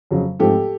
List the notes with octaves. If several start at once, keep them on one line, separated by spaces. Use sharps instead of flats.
F2 C#3 F#3
G#2 F3 A3 C4 G4 A4